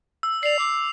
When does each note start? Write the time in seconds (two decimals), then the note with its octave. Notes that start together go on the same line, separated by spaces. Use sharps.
0.23 E6
0.43 D5 C7 F7
0.59 D6